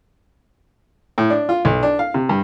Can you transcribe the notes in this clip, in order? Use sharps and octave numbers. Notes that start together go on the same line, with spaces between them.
A2
D4
F4
B1
D4
F5
C3
G2